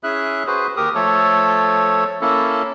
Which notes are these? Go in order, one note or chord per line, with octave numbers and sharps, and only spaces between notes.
C#4 E4 G#4 E5 F#6
F#4 G#4 B4 C5
D#2 G4 A#4 D#6
F3 A3 A4 C#5
A#3 C#4 E4 A4